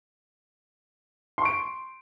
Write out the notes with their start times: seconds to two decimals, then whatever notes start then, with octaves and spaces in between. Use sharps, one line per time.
1.38 C6
1.42 C#6
1.45 D7